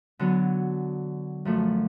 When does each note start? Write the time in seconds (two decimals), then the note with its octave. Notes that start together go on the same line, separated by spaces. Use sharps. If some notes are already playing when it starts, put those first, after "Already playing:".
0.19 D3 F#3 B3
1.45 F#2 F3 A3